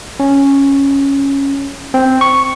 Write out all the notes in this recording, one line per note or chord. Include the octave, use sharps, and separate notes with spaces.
C#4
C4
C#6